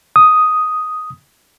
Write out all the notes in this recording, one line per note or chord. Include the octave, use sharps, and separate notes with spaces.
D#6